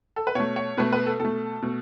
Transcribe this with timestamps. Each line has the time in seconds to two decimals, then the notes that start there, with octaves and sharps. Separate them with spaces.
0.16 A4
0.27 B4
0.35 B2 A3 C#5
0.56 C#5
0.77 B2 A3 B4
0.92 B4
1.06 A4
1.20 B2 A3 A4
1.62 B2 A3